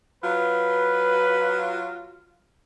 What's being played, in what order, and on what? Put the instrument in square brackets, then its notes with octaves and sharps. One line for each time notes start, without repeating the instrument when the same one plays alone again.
[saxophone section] F#3 F4 [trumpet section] B4